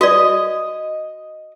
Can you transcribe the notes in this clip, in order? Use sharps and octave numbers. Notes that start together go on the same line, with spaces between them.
F#4 D5 D#5